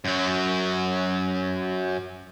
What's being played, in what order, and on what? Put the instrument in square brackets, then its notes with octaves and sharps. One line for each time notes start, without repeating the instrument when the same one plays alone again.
[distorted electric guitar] F#2 F#3